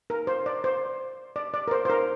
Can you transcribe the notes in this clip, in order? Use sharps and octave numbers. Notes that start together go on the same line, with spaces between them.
A#4
C5
D5
C5
D5
D5
A#4
C5
C5
A#4